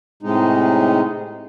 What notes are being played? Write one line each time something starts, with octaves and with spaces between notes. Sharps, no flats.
A2 C3 G#3 D#4